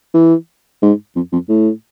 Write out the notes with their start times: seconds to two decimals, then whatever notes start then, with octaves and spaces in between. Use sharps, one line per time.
0.14 E3
0.82 G#2
1.16 F2
1.32 F2
1.49 A2